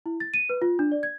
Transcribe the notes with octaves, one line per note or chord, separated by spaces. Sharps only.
E4
A6
D#7
B4
F4
D4
D5
G#6